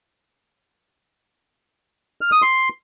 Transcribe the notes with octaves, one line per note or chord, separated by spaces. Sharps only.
F6
D#6
C6